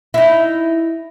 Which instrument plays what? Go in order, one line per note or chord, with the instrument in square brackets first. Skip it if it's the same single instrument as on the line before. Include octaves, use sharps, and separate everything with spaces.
[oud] D#4 E4